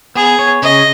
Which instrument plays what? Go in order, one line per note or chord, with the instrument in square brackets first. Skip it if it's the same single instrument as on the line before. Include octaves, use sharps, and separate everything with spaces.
[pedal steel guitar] B3 [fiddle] G#4
[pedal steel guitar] C#5
[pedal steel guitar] C#3 [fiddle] D#5